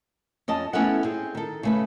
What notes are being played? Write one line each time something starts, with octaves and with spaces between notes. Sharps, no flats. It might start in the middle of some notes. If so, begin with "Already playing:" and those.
F2 C#4 D#5 A5
A3 B3 C#4 E4 A4 F#5
C4 G#4
D#3 A4
C#3 A3 B4